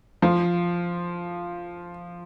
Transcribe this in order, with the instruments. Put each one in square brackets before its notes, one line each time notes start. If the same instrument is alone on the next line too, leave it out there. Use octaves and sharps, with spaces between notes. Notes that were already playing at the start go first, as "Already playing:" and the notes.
[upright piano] F3